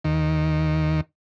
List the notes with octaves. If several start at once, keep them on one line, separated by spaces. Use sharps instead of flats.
D#2 D#3